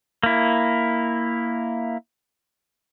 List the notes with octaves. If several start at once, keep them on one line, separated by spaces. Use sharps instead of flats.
A#3 E4